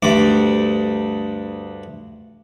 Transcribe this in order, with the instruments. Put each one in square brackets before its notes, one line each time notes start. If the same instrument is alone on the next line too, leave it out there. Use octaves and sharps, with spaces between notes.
[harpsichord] D2 G2 D6